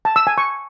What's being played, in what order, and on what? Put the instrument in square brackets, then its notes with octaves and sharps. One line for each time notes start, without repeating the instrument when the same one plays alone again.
[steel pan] A5
E6
G#5
C#6